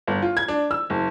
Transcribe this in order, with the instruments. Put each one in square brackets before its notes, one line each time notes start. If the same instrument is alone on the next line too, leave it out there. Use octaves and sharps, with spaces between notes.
[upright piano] G1
F4
G#6
D4
E6
F#1